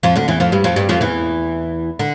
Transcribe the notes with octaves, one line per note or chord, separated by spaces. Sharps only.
F2 F3
D2 D3
E2 E3
F2 F3
G2 G3
F2 F3
G2 G3
F2 F3
E2 E3
D3